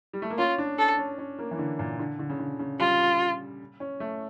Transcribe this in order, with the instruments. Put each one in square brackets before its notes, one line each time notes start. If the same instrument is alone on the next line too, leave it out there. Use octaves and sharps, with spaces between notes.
[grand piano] G3
A3
A#3
[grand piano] C#4 [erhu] F4
[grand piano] D4
[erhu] A4
[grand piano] C#4
C#4
A#3
E3
D3
A#2
D3
D3
C#3
D3
C#3
[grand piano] G3 [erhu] F4
[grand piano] C#4
A3